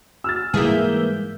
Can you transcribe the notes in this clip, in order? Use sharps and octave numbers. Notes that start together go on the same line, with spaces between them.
E6 F6 A6
G#2 E3 G3 A#3 G#4 E5 G6